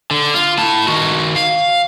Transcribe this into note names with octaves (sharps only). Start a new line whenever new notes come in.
D3
F4
E4 A5
D#3 F#4
F5